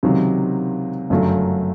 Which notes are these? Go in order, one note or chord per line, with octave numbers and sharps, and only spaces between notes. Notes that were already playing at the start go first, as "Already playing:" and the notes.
C#2 C3 D#3 F#3
G1 F#2 C#3 F#3 A3